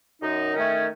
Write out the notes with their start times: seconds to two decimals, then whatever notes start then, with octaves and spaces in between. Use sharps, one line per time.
0.22 F#2 D#4
0.54 D#3 A3 C#4